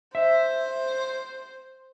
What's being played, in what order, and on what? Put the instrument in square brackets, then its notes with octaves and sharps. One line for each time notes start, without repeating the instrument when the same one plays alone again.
[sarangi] C5 [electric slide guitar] E5